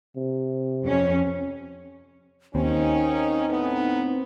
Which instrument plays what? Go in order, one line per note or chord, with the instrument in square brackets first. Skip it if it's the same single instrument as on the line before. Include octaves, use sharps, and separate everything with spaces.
[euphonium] C3
[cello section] F2 C#4
[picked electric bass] D#2 [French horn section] D#3 A#3 C#4 [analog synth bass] C4 [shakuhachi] D#4
[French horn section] A2 B3